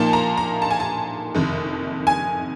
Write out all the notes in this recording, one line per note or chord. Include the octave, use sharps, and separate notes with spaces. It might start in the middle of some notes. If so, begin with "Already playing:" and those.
Already playing: A#2 F3 A#3 D#4 A5
A#5
A#5
A5
G#5
A5
F#1 F2 C3 D#3
G#5